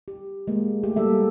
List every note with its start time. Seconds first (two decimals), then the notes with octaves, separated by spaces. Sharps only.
0.08 G4
0.48 G#3 A#3
0.84 A3 G4
0.96 G3 A#3 A4 E5